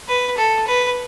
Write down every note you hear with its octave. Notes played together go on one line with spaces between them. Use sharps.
B4
A4
B4